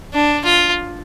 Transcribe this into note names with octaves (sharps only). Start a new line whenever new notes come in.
D4
F4